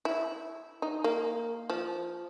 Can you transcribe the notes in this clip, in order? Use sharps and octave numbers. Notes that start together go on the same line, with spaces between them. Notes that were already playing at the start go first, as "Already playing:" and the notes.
E4
D#4
A#3
F3